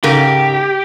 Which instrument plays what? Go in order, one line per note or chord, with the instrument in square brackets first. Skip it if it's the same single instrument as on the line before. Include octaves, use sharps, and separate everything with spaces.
[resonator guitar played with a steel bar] G#2 C#3 A#4 [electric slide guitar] G4